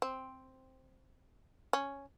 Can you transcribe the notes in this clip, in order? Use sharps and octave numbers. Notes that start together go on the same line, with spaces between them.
C4
C#4